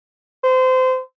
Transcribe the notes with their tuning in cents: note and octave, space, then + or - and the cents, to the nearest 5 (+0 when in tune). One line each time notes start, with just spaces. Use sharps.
C5 -25